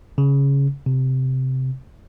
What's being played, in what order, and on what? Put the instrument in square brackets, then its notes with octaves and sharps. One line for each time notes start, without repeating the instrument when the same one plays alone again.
[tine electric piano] C#3
C3